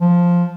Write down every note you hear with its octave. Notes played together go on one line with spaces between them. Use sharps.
F3